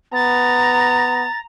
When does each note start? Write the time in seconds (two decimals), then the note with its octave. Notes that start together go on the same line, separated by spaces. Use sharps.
0.14 B3 A#5 A6